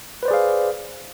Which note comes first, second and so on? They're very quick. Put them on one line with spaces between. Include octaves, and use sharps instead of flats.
B4 C5 D5 G#4 F5